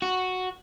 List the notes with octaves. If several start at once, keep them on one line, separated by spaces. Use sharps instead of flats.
F#4